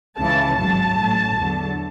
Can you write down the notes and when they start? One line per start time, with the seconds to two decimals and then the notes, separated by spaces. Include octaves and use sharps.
0.18 C#2 C#3 E3 A5
0.57 G#1 G#2 F#3 A5
0.97 A1 A2 F#3
1.36 E2 D3 F#3